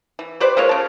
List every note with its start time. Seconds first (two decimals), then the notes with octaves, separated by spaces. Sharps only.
0.19 E3
0.40 G4 B4 C5 D5
0.57 G#3 A#3 F4 C#5
0.69 C#3 A5